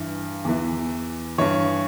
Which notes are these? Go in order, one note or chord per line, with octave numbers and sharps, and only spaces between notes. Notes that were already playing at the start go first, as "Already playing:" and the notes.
Already playing: G2 E3
E2 E3
G2 E3 C#5